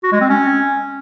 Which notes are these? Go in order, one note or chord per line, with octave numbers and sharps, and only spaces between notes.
F#4
G#3
C4
C#4